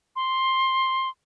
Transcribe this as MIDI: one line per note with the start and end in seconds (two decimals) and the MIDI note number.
0.16 1.09 84